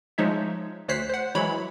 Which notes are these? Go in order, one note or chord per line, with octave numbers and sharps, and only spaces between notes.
F3 G#3 D#4 C#5 E5
D2 C5 C#5 F#6 B6 C7
C5 F#5
E3 F#3 G#3 E4 C#5 B5